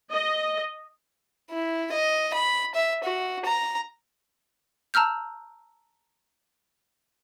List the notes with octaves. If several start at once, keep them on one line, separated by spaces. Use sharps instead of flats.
D#5
E4
D#5
B5
E5
F#4
A#5
A5 A#5 E6 F6 G6